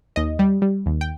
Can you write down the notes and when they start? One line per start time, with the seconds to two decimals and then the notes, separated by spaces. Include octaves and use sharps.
0.16 D#2 D#5
0.39 G3
0.62 G3
0.86 D#2
1.01 G5